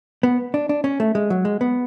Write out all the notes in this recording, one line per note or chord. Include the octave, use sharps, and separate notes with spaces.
B3
D4
D4
C#4
A3
G#3
F#3
G#3
B3